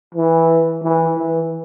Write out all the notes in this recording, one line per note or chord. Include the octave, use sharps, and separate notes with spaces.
E3
E3
E3